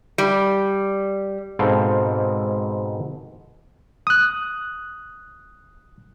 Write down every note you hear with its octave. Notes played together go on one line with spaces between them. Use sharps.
G3
G#2 B2 C4 A4 F5 G5
D#6 F#6